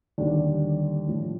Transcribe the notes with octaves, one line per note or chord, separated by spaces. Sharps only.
D#2 D3 G3 D4
A2 F3